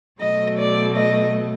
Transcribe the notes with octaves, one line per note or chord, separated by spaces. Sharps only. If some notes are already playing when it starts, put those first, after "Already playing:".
B2 F#3 A3 D#5
D5
D#5